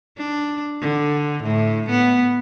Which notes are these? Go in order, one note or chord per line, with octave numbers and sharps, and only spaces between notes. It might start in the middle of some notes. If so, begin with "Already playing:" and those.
D4
D3
A2
B3